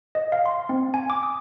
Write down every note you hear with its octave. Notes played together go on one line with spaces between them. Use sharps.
D#5
F5
C6
C4
G#5
D6
D#6